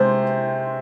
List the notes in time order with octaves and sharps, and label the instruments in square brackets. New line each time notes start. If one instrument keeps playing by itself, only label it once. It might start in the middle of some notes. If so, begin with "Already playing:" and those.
Already playing: [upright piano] C3 G#3 C5